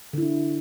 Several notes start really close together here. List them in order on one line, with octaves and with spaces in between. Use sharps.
D3 E4 D4